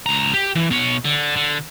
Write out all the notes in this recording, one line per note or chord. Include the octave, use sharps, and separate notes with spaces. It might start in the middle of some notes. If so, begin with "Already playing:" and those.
C#2 A#5
G4
E3
B2 C#5
D3
D3